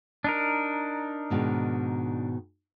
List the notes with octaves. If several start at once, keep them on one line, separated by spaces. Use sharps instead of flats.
D4 D#4 A#4
G#2 B2 D#3